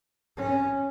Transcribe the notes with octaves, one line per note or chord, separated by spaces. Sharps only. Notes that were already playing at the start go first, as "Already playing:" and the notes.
C#4